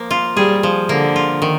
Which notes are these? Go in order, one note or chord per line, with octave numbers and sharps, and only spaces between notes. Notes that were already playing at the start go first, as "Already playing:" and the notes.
Already playing: F3 A#3
F4
G3 G#4
F3
D3 A#3
F4
D#3